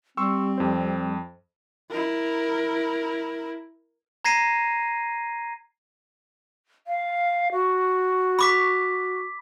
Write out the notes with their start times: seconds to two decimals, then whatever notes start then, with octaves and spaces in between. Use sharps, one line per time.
0.17 G3 C4 C6 C#6 E6
0.58 F2 C5
1.90 E4 A#4
4.25 A#5 G#6 A#6 C7 D#7
6.87 F5
7.52 F#4
8.39 B5 D6 B6